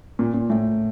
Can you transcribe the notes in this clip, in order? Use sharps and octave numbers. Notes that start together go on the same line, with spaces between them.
A#2
A#2
A2